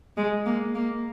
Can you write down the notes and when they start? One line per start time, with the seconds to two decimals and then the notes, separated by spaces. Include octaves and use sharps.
0.17 G#3
0.46 A#3
0.75 A#3